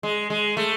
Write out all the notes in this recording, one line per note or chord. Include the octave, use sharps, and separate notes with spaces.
G#3
G#3
A3